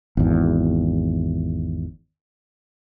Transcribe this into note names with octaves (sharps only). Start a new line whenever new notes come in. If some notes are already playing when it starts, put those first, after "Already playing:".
G#1 E2